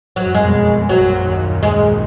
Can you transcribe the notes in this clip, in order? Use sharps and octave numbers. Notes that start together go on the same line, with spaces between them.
G#1 G#2 F#3
F#2
F2 G#3
B1 B2
A#1 A#2 F#3
F#2
A#1 A#2
F#2
D#2 D#3
G#3